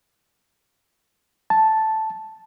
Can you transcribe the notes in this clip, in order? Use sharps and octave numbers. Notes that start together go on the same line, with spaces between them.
A5